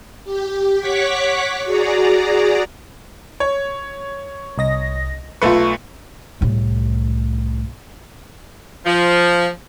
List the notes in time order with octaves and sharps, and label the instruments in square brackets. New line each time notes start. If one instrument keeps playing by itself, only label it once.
[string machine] G4
C#5 F#5 C#6 D6 B6
F#4 G#4 D5 A#5
[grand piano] C#5
[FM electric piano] C2 D#5 A#6
[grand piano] B1 A3 B4 [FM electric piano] F4 C#6
[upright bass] C2 A2
[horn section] F3